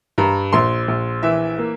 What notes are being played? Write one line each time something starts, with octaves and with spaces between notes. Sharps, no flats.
G2 A#5
A#1 C6
A#1
E3 E5
A#3